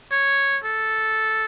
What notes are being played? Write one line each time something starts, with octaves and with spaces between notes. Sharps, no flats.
C#5
A4